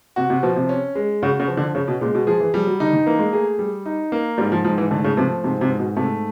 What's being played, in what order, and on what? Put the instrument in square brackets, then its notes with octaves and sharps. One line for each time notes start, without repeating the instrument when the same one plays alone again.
[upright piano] C3 [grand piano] F#4
[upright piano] C3
[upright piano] B2 [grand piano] F3
[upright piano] C3
[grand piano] C#4
G#3
[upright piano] C#3 [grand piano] F#4
[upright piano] C#3
[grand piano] F3
[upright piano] D3
[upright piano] C#3 [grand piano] C#4
[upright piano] B2
[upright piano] A#2 [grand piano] G#3
[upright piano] B2
[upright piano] F3 [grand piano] G#4
[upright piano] E3
[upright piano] F3 [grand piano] G3
[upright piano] F#3
[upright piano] D3 [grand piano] D#4
[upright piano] D#3
[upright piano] E3 [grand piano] A#3
[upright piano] G#3
[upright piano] A3 [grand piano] G#4
[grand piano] G3
D#4
A#3
[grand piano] G#2 [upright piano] G3
[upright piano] F3
[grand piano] G#2 [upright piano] F3
[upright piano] E3
[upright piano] D3 [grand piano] A3
[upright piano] C#3
[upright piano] C3 [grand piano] F3
[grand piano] G#2 [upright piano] C3
[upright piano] C3
[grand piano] G#2
[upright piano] B2
[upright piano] C3 [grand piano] A3